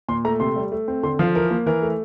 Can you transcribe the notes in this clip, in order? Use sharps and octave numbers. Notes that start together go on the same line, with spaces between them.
A#2 C6
A3 A#5
C3 C6
G3
A3
C4
D3 C6
F3 F5
E3 A#4
A#3
E3 A#4
A3